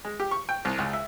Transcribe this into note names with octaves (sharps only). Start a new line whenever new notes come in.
G#3
G4
C#6
G5
C2
C#2
E5